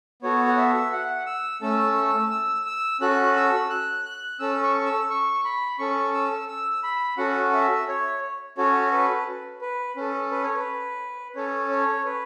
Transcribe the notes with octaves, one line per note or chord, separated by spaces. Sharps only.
B3 F#4 A4 C#5
F#5
E5
F#5
E6
A3 C#4 A4 E6
E6
E6
C#4 F#4 A4 F#6
E6
F#6
F#6
C#4 A4 E6
C#6
E6
C#6
B5
C#4 A4 C#6
E6
E6
B5
C#4 F#4 A4 F#5
E5
C#5
C#4 F#4 A4 C#5
B4
B4
C#4 A4
B4
C#5
B4
C#4 A4 C#5
C#5
B4